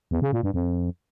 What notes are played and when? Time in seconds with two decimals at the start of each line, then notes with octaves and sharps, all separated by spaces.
0.11 E2
0.22 C#3
0.33 A#2
0.43 G2
0.54 F2